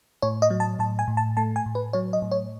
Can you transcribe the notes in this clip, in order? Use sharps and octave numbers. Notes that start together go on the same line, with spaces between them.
A2 C#5
D#5
F#3
A5
A2 A5
G#5
A2
A5
A3 A5
G#5
A2
B4
F#3 C#5
D#5
A2
C#5